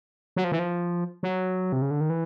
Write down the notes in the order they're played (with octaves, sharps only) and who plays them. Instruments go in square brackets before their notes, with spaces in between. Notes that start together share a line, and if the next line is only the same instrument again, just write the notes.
[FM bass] F#3
F3
E3
F3
F#3
C3
C#3
D3
D#3
E3